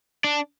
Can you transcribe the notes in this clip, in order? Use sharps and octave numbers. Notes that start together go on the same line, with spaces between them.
D4